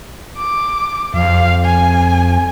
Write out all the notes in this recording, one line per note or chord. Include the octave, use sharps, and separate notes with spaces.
D6
F2 F5
G#5